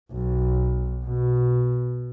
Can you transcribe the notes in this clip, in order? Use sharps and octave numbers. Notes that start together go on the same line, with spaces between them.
B1
B2